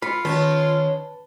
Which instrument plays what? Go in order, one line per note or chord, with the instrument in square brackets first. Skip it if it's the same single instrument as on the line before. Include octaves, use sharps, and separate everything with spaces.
[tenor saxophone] F4 [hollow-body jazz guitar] B5 [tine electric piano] B6 C#7
[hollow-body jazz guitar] D#3 [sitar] G#3 C#4 [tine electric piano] B4 A5